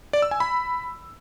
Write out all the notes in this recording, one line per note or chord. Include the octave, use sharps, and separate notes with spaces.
D5
E6
G#5
B5